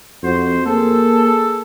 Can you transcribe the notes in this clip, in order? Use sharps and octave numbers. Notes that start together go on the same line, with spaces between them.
F2 F#4 C5
A#3 G#4 A4